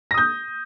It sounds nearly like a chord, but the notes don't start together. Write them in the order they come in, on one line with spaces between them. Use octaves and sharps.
A#6 D#6 G6